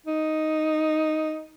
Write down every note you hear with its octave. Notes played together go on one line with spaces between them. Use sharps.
D#4